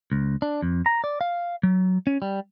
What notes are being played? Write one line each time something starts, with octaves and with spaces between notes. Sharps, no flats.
C#2
D4
F2
A#5
D5
F5
F#3
C#4
G3